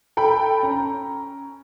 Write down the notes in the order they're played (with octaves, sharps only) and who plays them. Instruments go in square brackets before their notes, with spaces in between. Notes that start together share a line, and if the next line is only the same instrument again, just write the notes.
[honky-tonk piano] A4 G5 B5
C#4 A#5